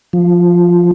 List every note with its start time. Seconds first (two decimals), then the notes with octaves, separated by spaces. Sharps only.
0.13 F3